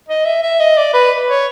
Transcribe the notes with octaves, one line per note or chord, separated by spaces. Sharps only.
D#5
E5
E5
D#5
D5
B4
C#5